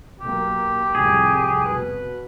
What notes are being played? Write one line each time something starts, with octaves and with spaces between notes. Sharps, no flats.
B1 A#3 G4
C2 F2 A2 G#4
B2 B4